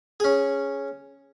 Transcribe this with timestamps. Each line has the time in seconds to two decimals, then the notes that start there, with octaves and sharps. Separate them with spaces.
0.20 C#4 G#4